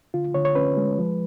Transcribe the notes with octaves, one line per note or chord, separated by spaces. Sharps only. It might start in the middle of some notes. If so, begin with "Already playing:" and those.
D3 F4
D3 C#5
C#5
C#4 B4
G#3
F3